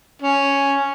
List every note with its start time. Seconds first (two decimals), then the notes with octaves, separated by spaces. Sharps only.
0.22 C#4